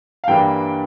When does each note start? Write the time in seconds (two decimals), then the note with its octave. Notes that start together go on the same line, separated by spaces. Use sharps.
0.24 F5
0.27 G2 E3 G3 A#3 D4 G5